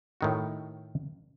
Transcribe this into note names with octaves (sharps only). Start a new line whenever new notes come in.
A2 D#3 F#4